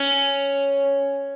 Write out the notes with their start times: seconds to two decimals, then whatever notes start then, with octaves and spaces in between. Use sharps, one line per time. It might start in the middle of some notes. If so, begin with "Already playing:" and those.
Already playing: C#4